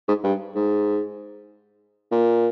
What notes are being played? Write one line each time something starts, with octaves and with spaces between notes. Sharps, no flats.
G#2
G2
G#2
A#2